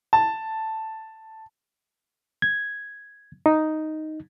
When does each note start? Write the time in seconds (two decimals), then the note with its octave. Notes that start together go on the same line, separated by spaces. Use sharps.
0.13 A5
2.42 G#6
3.46 D#4